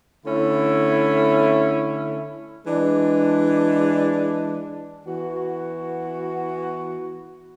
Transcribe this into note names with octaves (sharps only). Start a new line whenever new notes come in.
D3 A3 C#4 E4
E3 G#3 D4
E3 B3 F#4